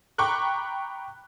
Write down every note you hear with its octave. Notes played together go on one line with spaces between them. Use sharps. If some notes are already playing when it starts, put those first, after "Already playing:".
G5 A#5 B5 C#6 D6 F#6